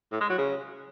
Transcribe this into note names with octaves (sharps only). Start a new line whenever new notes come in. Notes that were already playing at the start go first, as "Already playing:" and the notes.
A2
G#3
F#3
C#3